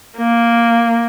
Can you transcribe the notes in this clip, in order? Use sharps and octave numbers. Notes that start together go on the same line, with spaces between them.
A#3